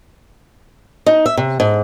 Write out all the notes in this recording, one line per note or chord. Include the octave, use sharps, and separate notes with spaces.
D#4
E5
C3
G#2